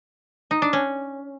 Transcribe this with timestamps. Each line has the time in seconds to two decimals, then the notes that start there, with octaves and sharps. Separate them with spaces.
0.51 D#4
0.62 D4
0.73 C#4